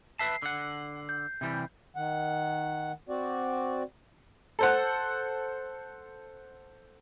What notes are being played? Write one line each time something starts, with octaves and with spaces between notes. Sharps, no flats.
B4 E5 A5 C7
D3 F#5
G6
C3 E3 G3
D#3 F#5
C4 F#4 D5
A4 C5 F#5